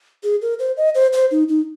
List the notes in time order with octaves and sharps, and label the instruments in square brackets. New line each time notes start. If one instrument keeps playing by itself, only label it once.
[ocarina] G#4
A#4
C5
D#5
C5
C5
D#4
D#4